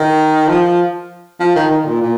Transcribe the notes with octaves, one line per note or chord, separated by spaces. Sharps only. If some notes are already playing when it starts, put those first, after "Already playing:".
Already playing: D#3
F3
F3
D#3
D#3
A#2
A#2